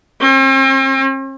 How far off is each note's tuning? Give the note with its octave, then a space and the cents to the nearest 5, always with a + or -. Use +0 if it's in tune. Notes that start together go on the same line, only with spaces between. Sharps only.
C4 +45